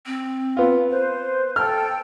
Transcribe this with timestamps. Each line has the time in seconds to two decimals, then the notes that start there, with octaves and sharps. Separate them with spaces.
0.06 C4
0.57 B3 F4
0.90 B4 C5
1.56 A4 G5 F6